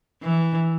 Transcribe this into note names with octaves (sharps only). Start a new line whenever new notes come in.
E3